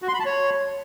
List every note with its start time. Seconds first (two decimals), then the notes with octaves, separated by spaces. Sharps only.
0.02 F#4
0.08 C6
0.14 B5
0.20 A5
0.25 C#5